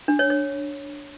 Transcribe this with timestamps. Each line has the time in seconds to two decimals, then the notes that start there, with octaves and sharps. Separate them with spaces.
0.08 D4
0.19 C#5
0.30 C#5